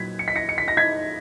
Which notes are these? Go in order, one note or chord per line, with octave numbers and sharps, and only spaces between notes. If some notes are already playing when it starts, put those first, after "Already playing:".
Already playing: A#2 F#3 G#6 B6
C#7
B6
A#6 C#7
C#7
B6
A#6
G#6 B6